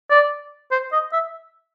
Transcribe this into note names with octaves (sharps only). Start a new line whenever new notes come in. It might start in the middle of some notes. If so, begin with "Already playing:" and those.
D5
C5
D#5
E5